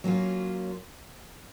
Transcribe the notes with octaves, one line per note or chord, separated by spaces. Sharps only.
F#3 A#3 C#4 F4